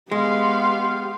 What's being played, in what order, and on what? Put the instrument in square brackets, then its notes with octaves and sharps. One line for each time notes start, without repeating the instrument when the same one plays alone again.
[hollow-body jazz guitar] G#3 [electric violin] B3 F5 [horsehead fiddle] G4 [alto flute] C6